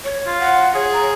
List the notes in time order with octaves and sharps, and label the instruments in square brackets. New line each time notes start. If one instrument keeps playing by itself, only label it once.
[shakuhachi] C#5
[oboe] F4
[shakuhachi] F#5
[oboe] G#4 [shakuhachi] C#5
[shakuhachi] A#5